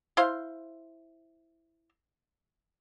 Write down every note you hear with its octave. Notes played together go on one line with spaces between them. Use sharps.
E4 C5 F5 C6